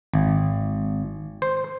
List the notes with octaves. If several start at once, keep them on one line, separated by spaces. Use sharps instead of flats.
G#1
C5